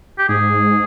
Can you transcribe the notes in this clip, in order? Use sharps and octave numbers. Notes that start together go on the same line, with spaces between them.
G4
G#2 G#4